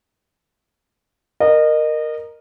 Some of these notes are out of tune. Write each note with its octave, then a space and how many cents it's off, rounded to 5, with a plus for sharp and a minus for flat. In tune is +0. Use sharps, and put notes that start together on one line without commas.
A#4 +0 D#5 -25